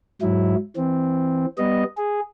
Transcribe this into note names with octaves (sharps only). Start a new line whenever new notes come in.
G#2 F#3 E4
E3 C4
G3 B3 D#5
G#4